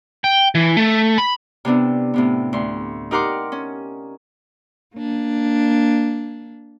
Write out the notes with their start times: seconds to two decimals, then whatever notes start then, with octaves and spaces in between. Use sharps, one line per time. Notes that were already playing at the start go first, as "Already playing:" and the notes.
0.24 G5
0.55 E3
0.77 A3
1.18 B5
1.65 C3 B3 D4 E4
2.14 A2 C3 B3
2.53 D2 C6
3.11 D#4 G4 A#4 F#5 C6 D6
3.52 C#4
4.95 A#3 D4